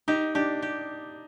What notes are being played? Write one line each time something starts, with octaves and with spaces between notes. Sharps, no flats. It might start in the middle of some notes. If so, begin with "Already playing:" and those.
D#4 G4
D4 G4
G4